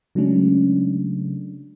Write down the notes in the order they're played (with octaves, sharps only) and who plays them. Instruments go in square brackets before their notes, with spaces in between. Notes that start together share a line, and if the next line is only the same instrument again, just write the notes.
[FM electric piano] C#3 F#3 G#3 A3 C#4 D4